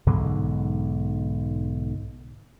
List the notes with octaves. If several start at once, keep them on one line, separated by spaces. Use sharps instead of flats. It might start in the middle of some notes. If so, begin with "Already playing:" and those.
B1 G#2 D3 G#3